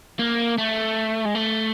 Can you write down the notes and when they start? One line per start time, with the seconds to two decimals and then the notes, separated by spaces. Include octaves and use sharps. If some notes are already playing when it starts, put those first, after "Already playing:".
0.19 A#3
0.58 A3
1.25 G#3
1.35 A3